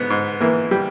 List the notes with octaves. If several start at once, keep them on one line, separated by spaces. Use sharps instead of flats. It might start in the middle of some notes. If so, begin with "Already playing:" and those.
Already playing: G#2 B3
G#2
E3 A#3
G3